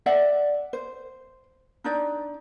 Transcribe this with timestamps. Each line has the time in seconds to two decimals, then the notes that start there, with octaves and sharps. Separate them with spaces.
0.06 D5 E5 F#5
0.73 C5
1.84 D4 D#4 D5